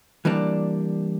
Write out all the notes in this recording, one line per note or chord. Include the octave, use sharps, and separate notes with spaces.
E3 G3 A#3 D4